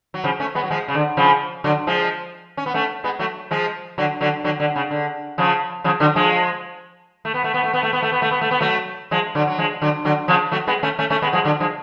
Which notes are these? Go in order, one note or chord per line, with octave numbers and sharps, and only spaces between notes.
F#3
C#3 F3
A3 C#4
G#3 B3
F#3
F3 G#3
C#3
D3
C#3 F3
D3 F#3
F3 G#3
C#4
B3
A3 C#4
G#3 B3
F#3 A3
F3 G#3
D3 F#3
D3 F#3
D3 F#3
D3
C#3
D3
C#3 F3
C#3 F3
D3 F#3
F3 G#3
A3
B3
A3
B3
A3
B3
A3
B3
A3
B3
A3
B3
A3
B3
F#3 A3
F3 G#3
D3 F#3
F#3
F3 G#3
D3 F#3
D3 F#3
C#3 F3
F#3 A3
G#3 B3
A3 C#4
A3 C#4
A3 C#4
G#3 B3
F3 G#3
D3 F#3
F3 G#3